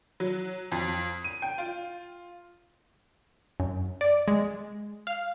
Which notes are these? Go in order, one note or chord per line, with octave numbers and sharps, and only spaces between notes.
F#3
F2
D#7
G5
F4
F#2
D5
G#3
F5